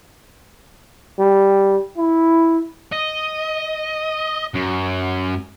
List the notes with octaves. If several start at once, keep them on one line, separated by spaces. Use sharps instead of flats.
G3
E4
D#5
F#2